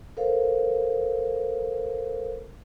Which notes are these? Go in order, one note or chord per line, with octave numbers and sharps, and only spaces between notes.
A4 A#4 C5 F5